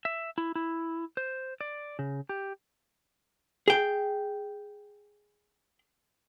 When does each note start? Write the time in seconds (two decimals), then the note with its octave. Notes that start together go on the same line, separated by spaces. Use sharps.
0.05 E5
0.38 E4
0.55 E4
1.17 C5
1.61 D5
1.99 C#3
2.29 G4
3.68 G#4 G5